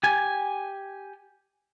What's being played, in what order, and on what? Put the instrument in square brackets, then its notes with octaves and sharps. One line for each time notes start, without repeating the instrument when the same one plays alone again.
[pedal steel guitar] G4 G#5